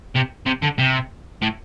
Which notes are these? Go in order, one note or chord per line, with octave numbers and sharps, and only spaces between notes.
C3
C3
D3
C3
A2